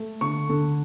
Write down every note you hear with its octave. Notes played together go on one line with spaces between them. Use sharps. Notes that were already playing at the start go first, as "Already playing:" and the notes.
Already playing: A3
D3 C#6
D3